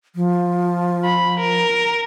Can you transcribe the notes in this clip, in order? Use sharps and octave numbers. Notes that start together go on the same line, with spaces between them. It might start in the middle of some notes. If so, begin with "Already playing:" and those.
F3
B5
A#4